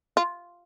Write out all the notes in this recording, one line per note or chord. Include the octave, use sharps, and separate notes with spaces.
F4